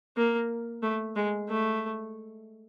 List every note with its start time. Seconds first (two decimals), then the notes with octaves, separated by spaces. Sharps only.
0.17 A#3
0.83 A3
1.16 G#3
1.48 A3